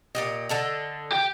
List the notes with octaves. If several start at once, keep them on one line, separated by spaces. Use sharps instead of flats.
A#2 G4 D#5
D3 A4 D#5
G4 G5